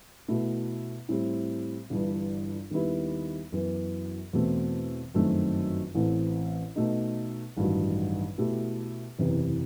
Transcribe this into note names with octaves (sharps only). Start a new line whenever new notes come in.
B2 A3 E4
A2 G3 C4
G1 G2 E3
D#2 D#3 G3 B3 E4
F#2 E3 B3
E2 B2 A3 C4
G1 F#2 D#3 A3 C4
A1 A2 E3 A3 C4
B2 A3 D#4
A1 G2 D#3 F#3
B2 A3 E4 G4
F#1 E2 C3 E3